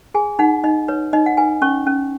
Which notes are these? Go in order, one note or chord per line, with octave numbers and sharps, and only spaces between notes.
G#4 G#5
D#4 F#5
D#4 D#5
B4 C#5
D#4 D#5
F#5
B4 G#5
C#4 C#6
C#4